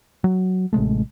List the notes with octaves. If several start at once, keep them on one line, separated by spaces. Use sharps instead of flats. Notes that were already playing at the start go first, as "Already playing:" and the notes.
F#3
A1 C3 G#3 A3